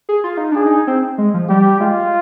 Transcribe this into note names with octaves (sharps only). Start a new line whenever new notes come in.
G#4
F4
D#4
D4 G#4
D#4
C4
G#3
F3
G3 G4
G#3 F4